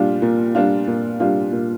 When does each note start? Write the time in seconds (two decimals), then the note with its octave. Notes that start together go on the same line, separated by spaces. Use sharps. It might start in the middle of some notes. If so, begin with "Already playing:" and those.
Already playing: A#2 G3 D4 F4
0.22 A#2
0.55 G3 D4 F4
0.88 A#2
1.20 G3 D4 F4
1.52 A#2